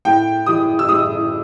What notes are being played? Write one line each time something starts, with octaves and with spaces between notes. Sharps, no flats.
A2 G5
E3 D#6
E6
A2 D#6